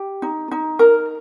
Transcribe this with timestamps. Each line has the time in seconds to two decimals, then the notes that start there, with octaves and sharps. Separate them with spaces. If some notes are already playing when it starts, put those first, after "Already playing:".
Already playing: G4
0.22 D#4
0.51 D#4
0.79 A#4